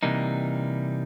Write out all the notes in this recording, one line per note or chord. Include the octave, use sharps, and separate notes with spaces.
C3 E3 G3 A#3 D#4